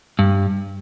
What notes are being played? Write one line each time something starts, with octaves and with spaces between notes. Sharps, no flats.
G2